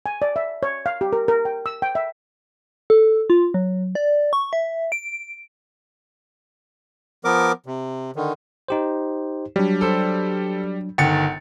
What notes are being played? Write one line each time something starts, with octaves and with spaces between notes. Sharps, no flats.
G#5
D5
E5
C#5
F5
G4
A#4
A#4
G5
E6
G5
E5
A4
F4
F#3
D5
C#6
E5
D7
F3 B3 A#4 D6
C3
D3 D#3
D#4 G4 C5
F#3 G3 D4
A4 C5
G1 D#3 F#5 G5 A6 C#7